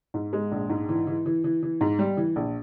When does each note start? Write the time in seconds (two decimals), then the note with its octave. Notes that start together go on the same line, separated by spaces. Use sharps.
0.14 G#2
0.33 G#3
0.52 A#1
0.70 G#2
0.89 E3
1.07 E3
1.26 E3
1.44 E3
1.63 E3
1.81 G#2
1.99 G3
2.17 E3
2.36 A#1